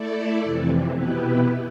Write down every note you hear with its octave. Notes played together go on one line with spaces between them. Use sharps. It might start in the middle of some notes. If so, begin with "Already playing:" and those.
Already playing: A3 E4 A4 D5
F2 C3 E3
B2 B3 E4 G4 B4